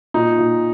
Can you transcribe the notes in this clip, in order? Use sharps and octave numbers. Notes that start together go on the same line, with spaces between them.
A#2 D#4
A#2